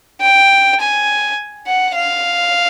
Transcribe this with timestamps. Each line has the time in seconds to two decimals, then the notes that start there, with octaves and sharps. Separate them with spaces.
0.21 G5
0.81 G#5
1.67 F#5
1.95 F5